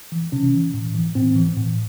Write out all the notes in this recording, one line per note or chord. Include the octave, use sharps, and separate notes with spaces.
E3
C3 C#4
E3
A2
E3
A2 C4
E3
A2